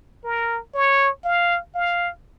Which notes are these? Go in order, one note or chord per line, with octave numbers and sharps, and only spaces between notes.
A#4
C#5
F5
F5